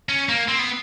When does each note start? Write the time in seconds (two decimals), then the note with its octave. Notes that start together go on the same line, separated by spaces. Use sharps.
0.09 C#4
0.29 A#3
0.48 C4
0.59 B3